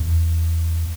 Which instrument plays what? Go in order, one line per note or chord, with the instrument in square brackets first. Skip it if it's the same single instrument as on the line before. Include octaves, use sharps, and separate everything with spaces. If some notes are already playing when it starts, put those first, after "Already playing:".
Already playing: [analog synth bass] E2